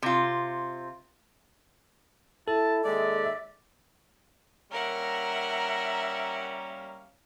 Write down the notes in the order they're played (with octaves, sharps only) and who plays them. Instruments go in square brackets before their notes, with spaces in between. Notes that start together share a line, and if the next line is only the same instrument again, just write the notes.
[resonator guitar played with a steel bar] C3 F4
[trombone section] E4 [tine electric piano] A4 [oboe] A5
[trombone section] D#2 G#3 [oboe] D5 [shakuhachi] E5
[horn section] G3 A#3 C#4 [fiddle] A#4 F#5 [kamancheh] E5 A#5